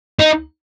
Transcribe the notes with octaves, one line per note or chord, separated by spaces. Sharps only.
D#4